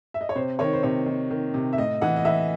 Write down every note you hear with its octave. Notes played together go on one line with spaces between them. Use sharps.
E5
D#5
C#5
C3 C5
D#3 C#5
C5
C3 C#5
D#3
D#3
C3
E5
A2 D#5
E3 F#5
D#5
E3 E5